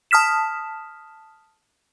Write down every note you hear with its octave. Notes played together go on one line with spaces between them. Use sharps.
A5 D#6 F6 B6 E7